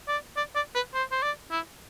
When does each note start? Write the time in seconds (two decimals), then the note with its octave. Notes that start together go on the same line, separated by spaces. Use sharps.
0.08 D5
0.37 D5
0.55 D5
0.75 B4
0.94 C5
1.11 C5
1.22 D5
1.51 E4